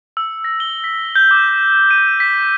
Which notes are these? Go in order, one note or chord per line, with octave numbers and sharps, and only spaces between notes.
E6
A#6
G7
B6
G6
D6
D#7
B6